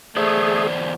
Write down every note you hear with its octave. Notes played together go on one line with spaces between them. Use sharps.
E2 A3 G#4 C5 D5